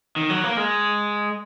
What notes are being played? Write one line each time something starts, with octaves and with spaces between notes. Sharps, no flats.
D#3
F#3
A#3
G#3